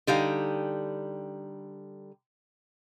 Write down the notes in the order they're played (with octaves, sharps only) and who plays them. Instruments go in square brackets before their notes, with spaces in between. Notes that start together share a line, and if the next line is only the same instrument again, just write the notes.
[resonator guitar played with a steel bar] D3 G3 D#4 F5